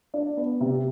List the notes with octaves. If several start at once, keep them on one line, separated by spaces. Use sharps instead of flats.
D4
B3
C3